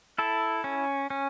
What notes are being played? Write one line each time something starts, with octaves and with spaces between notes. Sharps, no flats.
E4 A4
C#4
C#4